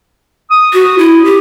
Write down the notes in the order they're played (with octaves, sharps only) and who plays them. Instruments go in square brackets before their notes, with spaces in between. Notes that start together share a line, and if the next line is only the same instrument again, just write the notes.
[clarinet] D#6
[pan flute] F#4
E4
G4